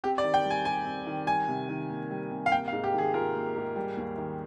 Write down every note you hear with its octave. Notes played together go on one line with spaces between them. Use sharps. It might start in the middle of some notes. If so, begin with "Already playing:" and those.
C4 G4
D5
D#3
G5
G3
G#5
G4 G#5
C4
D#3
G3 G#5
C3
D#3
A#3
G3
C3
F5
A#3 G5
F5
G#2
G4
D#3 G#4
F4 A#4
A#3
G#2
G3
D#2
D#3